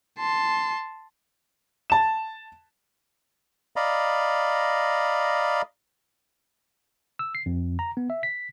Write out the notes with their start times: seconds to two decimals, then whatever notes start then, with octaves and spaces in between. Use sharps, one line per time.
0.19 A5 C6
1.90 A5 E7
3.76 D5 D#5 F5 A#5 B5
7.19 E6
7.35 C7
7.46 F2
7.79 A#5
7.97 B3
8.10 E5
8.23 B6